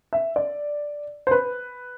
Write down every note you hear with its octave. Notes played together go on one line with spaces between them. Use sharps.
E5
D5
C5
B4